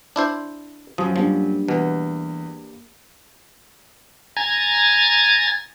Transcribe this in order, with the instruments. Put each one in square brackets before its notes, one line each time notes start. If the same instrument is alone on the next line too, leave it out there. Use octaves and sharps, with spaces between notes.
[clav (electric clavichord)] D4 E4 C5
[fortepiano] F#2 [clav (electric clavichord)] F3 [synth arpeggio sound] F#3 D#6
[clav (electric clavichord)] F3 [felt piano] G3 A#3 D4
[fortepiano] E2 [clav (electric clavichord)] B2
[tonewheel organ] G#5 A#5 G#6 A6